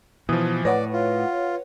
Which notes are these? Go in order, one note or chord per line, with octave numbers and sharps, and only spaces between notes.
B2 E3 F3 D#6
A2 B4 C#5 D5 F#5 A#6
F4